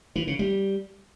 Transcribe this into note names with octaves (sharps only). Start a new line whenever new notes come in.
E3
C#3
G3